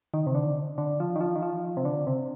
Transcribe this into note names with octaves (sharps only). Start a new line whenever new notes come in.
D#3
C3
D3
D3
F3
D#3
F3
D#3
F3
C3
D3
C3